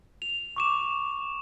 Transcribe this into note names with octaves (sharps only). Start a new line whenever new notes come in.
F7
C#6 D6 E7